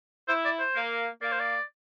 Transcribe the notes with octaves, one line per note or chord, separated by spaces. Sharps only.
E4 C5
D5
C5
A#3
A#3 D5
C5
D5